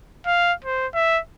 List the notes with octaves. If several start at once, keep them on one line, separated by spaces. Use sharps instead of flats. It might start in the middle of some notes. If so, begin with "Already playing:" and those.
F5
C5
E5